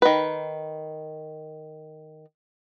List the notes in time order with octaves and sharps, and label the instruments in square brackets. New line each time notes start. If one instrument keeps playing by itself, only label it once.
[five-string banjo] D#3 B4